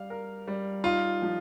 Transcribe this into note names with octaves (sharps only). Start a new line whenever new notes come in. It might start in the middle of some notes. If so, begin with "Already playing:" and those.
Already playing: G3 F5
A#4
G3
D#4 F4
F3